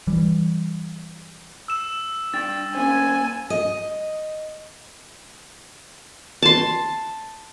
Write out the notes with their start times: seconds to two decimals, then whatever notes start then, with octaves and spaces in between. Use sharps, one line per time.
0.07 E3 G3
1.68 E6 E7
2.34 D4 G5 A6
2.75 A#3 C#4 C5 G#5
3.50 D#5
6.42 A5 C6